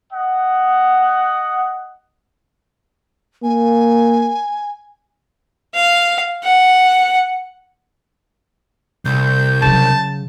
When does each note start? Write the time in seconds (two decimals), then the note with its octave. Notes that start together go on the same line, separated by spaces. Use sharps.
0.12 D#5 F#5
3.43 A#3 G#5
5.75 F5
6.44 F#5
9.05 C2 G6
9.62 C#3 F#3 A5